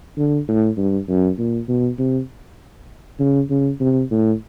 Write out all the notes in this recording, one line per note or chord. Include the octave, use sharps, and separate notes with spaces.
D3
A2
G2
F#2
A#2
B2
C3
C#3
C#3
C3
A2